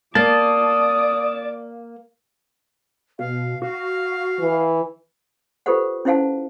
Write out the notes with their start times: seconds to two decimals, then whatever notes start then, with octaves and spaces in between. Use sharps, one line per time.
0.15 A#3 D5 A5 D#6
3.19 B2 F5
3.62 F#4 F5
4.40 E3
5.66 F4 G4 A4 B4 C5 F#5
6.05 C#4 E4 C5 F5 F#5 A5